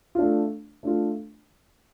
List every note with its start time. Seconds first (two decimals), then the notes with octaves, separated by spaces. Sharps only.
0.15 A3 D4 F4
0.83 A3 D4 F4